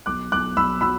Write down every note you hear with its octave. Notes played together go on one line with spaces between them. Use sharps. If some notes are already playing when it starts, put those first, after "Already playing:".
B1 D6 F#6
B1 D6 F#6
B1 B5 E6
F#3 B5 E6